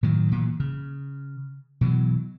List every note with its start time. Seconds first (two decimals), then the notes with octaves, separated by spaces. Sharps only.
0.03 A2 D#3 F#3
0.32 A#2 E3
0.60 C#3
1.81 B2 E3 F#3